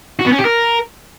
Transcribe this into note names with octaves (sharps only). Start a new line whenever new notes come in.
F#4
B3
C#4
G4
A#4